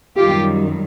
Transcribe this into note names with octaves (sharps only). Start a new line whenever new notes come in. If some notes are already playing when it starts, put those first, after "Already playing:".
F#2 D#3 G3 F4 G4